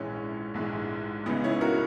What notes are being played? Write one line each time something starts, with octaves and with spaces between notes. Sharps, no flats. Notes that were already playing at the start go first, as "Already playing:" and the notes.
Already playing: A#1 G#2 E3 G#3 C#4
A#1 G#2 E3 G#3
C#2 C#3 E3 B3 D#4
C#4 E4
F#4 A#4